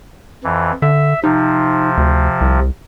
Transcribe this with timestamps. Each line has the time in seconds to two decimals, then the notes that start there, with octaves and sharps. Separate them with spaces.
0.44 F2 E3
0.82 D3 E5
1.24 C3 F3 D#4
1.97 D2
2.41 C2